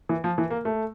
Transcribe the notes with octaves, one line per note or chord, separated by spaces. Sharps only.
E3
F3
E3
A#3
A3